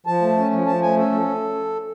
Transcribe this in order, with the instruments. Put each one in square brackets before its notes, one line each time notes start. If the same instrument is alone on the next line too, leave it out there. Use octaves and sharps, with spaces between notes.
[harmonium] F3 A5
A3
C#4
F3
F3 A5
A3 G#5
C#4 A4
F3